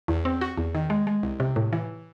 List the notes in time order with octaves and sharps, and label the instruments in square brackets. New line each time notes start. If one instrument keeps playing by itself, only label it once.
[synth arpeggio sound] E2
C4
F#4
E2
D#3
G#3
G#3
C2
C3
A2
E3